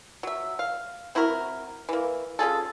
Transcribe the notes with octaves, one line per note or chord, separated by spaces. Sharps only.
F#3 E5
F5
C4 E4 F#4 A#4
E3 A#3
C#4 F4 G#4 A4